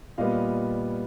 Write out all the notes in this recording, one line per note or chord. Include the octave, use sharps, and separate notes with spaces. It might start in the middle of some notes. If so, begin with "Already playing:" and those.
A#2 G3 B3 D#5 F5